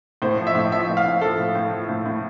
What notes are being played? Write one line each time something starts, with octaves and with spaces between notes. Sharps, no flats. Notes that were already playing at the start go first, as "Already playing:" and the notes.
A2 C5
F3
E5
A2
F3 E5
A2
F5
A2
F3 A4
A2
A2
F3
A2
A2